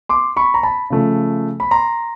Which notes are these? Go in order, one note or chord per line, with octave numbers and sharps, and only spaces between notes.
C6 D6
B5 C#6
A#5
A5 B5
C#3 F3 A3
B5
A#5 C6